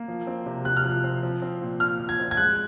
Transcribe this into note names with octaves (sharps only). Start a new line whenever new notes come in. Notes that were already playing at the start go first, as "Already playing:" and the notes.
Already playing: A#3
F3
C4
C3
C3 F#6
F6
F3 F#6
C4
F3
C4
A#2
A#2 F6
F3
G#6
C4
G#6
G#3 F#6